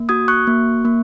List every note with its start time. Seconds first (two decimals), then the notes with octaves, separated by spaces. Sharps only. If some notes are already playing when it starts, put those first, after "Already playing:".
Already playing: A#3
0.09 F#4 D#6 G#6
0.28 C#6 F#6
0.47 A#3
0.85 A#3